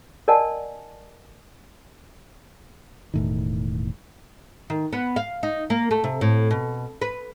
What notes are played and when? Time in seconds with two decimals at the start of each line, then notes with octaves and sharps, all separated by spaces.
0.28 A#4 D5 D#5 F#5 G#5 A5
3.14 E1 A2 D#3
4.70 D#3
4.93 B3
5.16 F5
5.43 D#4
5.70 A#3
5.91 A3
6.04 C3
6.21 A2
6.51 B2
7.01 B4